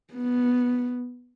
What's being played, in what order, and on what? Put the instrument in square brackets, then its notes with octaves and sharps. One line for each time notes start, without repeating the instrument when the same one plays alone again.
[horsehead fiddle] B3